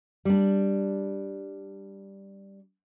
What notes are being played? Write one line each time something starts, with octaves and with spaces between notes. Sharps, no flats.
G3 D4